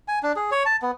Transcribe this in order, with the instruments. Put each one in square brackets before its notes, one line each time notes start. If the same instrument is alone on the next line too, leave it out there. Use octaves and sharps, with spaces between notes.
[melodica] G#5
D4
G#4
C#5
A5
B3